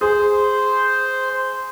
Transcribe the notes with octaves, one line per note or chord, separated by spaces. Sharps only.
G#4 C5